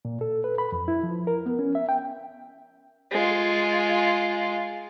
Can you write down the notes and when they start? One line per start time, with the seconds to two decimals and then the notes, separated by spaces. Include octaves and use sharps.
0.05 A#2
0.21 A4
0.44 B4
0.58 B5
0.72 F2
0.88 E4
1.03 F3
1.27 A#4
1.46 B3
1.59 C#4
1.75 E5
1.89 G5
3.12 G#3 F4